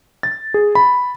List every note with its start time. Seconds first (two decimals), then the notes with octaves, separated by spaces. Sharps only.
0.23 A6
0.54 G#4
0.75 B5